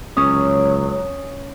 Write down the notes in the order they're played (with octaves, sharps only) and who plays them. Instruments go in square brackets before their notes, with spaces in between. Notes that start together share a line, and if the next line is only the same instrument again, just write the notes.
[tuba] C#2 [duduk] F#3 [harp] C#4 [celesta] D#6